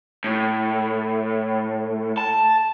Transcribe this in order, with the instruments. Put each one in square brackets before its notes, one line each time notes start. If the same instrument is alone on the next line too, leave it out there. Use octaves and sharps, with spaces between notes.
[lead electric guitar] A2
A5